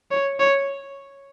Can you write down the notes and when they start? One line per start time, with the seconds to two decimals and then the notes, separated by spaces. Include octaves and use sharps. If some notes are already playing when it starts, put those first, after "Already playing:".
0.11 C#5
0.40 C#5